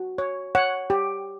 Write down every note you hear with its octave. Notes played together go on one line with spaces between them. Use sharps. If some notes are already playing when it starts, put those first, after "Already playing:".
Already playing: F#4
C#5
C#5 F#5
G4